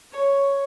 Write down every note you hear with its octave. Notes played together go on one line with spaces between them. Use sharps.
C#5